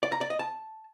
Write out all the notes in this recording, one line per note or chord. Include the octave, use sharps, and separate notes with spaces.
D5
A#5
D5
D#5
A5